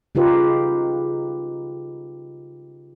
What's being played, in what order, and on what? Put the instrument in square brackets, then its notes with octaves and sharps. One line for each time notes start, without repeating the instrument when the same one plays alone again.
[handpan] C#3 D#4 F4 G4 B4